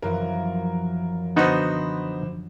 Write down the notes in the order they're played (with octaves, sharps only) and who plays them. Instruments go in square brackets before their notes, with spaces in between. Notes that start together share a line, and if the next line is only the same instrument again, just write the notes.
[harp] F#2 E3 F3 [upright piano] A#4
[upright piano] D3 C5 B5 [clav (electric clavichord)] B3 D#4 F#4